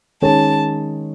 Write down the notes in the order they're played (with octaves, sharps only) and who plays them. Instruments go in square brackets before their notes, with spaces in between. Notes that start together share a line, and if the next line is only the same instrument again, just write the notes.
[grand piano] D#3 G#3 C#4 G#4 C#5 [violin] A5